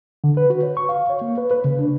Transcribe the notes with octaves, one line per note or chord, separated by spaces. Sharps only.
D3
B4
F#4
C#5
C#6
F5
C#5
A#3
B4
B4
C#3
D4